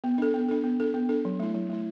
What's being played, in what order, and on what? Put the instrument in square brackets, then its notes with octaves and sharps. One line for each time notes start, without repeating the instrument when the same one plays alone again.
[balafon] B3
D4 A4
B3
D4 A4
B3
D4 A4
B3
D4 A4
F#3
A3 E4
F#3
A3 E4